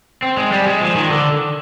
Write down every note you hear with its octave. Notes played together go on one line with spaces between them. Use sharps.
C4
G#3
G3
G#3
F3
D#3
D3